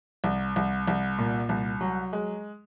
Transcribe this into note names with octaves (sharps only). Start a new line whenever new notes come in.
C2
C2
C2
A#2
C2
F#3
G#3